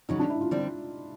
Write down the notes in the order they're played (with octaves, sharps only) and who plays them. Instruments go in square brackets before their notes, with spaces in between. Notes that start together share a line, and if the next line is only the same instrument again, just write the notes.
[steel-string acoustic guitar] D#2 C#3 F#3 [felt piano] D#4
[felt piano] D4
E4
F4
[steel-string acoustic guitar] D3 G3 C4